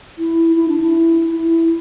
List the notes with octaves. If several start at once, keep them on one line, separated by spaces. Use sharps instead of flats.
E4
E4
D4
E4
E4